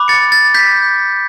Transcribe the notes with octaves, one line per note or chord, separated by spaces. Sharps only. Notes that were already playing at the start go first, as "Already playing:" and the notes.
Already playing: B5 D6 F#6
A6 C#7
A6
G6 B6